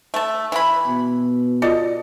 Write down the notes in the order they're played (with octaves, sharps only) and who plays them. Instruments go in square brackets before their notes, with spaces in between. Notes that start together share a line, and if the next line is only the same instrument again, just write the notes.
[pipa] A3 A5
E3 E4 B5
[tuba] B2
[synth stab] F4 D5 D#5 [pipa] A4